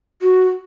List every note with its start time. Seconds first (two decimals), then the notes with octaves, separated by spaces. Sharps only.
0.22 F#4